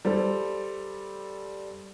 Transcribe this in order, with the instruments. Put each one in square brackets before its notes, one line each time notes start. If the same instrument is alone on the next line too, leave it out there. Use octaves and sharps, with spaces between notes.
[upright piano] G3 A4 C5